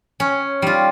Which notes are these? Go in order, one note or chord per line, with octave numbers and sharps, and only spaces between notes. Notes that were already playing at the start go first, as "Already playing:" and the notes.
C#4
G3 F4